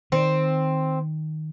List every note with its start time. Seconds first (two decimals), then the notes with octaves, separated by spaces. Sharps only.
0.12 D#3 C4